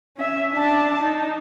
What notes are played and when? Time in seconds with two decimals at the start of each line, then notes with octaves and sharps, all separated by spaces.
0.17 C#4 E5
0.53 D4 A5
1.02 D#4